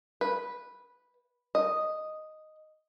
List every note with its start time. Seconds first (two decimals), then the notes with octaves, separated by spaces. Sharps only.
0.21 B4
1.55 D#5